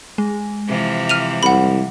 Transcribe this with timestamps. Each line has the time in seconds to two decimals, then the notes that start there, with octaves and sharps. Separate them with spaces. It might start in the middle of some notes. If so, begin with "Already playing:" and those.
0.18 G#3
0.67 C3 E3 F3
1.09 F6 D#7 F7
1.43 C2 F#5 B5